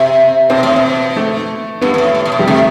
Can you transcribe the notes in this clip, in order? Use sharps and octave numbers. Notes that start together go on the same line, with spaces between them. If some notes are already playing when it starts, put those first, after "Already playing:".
Already playing: C3 C4
B2 C4
A2
B2
A3
G2 B3
G2
A2
A2
A2
B2
G3
C3 A3